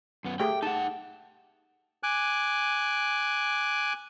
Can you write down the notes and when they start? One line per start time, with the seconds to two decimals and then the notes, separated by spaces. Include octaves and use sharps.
0.24 F#2 B3
0.40 A3 G4 G#4 G5
0.62 D#4 F#5 A5
2.03 G#5 D6 F#6